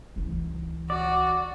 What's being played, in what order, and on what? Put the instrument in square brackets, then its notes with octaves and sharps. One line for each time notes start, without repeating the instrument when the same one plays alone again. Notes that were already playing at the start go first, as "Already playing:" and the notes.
[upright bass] C#2 E3
[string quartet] F#4 [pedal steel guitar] D5